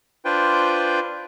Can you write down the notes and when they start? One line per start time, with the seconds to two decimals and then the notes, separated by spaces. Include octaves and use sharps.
0.25 D4 F4 B4 C5 G5